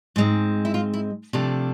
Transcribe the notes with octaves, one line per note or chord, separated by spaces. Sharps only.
G#2 G#3 C4
E4
F4
E4
C3 F3 A3 D4